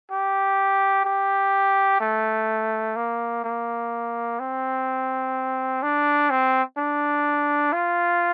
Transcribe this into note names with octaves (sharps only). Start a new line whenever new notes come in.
G4
G4
A3
A#3
A#3
C4
D4
C4
D4
F4